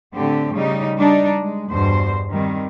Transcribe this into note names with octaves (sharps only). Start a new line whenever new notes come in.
A2 D3 C4 G4
C#3 G3 D#4
G3 D4 D#4
G#3
E2 G2 B2 C5
D#3 G3 C4